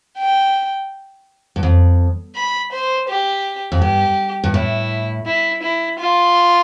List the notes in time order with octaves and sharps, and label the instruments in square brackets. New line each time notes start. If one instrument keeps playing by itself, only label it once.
[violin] G5
[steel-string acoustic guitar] G2
F2
[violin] B5
C5
G4
[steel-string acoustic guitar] F2
[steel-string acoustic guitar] G2 [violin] G4
[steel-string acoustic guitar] G2
[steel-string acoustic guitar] A2 [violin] E4
[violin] E4
E4
F4